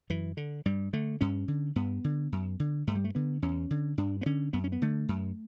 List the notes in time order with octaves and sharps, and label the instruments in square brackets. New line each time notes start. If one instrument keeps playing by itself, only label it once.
[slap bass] F#2 E3
D3
G2 G3
D3 A3
G2 C#4
D3
G2 B3
D3
F#2
D3
G2 A3
G3
A3
D3 B3
E2 C#4
D3
G2 D4
B3
D3 C#4
F#2 B3
C#4
B3
D3 A3
F#2